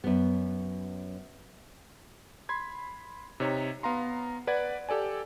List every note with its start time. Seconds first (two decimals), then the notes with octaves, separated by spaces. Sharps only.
0.04 F#2 B3
2.49 B5 C6 G#6
3.40 C3 D#4 C#5
3.83 B3 F5 A#5 C6
4.47 B4 D5 F#5 G#6
4.89 G4 A4 D5 G#5